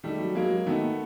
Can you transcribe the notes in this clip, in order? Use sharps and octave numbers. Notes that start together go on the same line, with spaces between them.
D#3 G3 A3
F#3
F#3 G#3 A#3
F#3
D#3 A3 B3
A#3